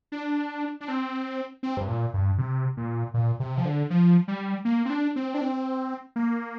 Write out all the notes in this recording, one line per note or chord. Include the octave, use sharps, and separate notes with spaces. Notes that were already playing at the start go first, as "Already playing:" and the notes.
D4
D4
C4
C4
G2
A#2
G2
C3
A#2
A#2
C3
F3
D3
F3
G3
A#3
C4
D4
C4
D4
C4
A#3